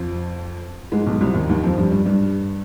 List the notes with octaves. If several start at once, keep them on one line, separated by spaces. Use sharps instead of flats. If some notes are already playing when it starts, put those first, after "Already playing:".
Already playing: F2 F3
G#2 G#3
B1 B2
C2 C3
D#2 D#3
D#2 D#3
F2 F3
G2 G3
G2 G3
G2 G3